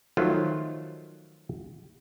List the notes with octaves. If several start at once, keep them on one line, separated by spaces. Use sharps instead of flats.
D#3 F3 F#3 A3 F4 C5